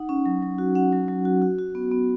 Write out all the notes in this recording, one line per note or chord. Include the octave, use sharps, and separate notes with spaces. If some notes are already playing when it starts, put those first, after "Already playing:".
Already playing: D#4 F#5
C#4
F#3
F#3
F#4
C#4 F#5
F#3
F#3
F#4
F#4
F#4
B3
B3